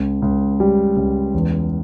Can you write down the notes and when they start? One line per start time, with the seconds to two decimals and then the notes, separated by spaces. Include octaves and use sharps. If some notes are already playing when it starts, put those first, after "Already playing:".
Already playing: C#2
0.22 C#2
0.60 G3
0.96 C#2
1.34 E2